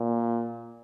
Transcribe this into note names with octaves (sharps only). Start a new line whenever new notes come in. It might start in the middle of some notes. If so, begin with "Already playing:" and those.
Already playing: A#2